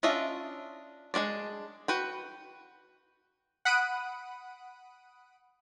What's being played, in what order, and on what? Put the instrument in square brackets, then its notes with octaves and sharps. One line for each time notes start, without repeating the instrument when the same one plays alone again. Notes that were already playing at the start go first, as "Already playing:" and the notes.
[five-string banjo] C#4 D4 F4 D#5 E5
G#3 C4 D4 D5
F#4 B4 G5
[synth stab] F#5 B5 D#6 F#6 D7 D#7